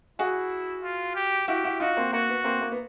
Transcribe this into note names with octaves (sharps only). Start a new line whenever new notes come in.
E4 F#4 G#4
F4
G4
E4 F#4 G4
E4 F#4
D#4 F4 F#4
A#3 C4
A#3 F#4
B3
A#3 C4
A#3
B3